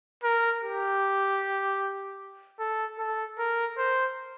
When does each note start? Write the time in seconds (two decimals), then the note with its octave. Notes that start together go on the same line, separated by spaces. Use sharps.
0.24 A#4
0.62 G4
2.60 A4
2.99 A4
3.39 A#4
3.78 C5